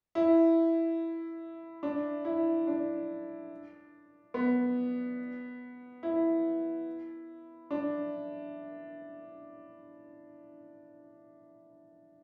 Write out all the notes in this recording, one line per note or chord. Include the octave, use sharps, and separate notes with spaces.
E4
D4
E4
D4
B3
E4
D4